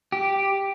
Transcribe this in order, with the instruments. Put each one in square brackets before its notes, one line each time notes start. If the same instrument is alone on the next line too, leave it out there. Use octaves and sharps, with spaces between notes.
[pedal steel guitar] G4